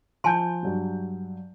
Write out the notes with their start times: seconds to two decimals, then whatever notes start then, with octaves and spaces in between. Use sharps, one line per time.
0.24 F3 G#5 A5 C6 G6
0.63 G2 F#3 G3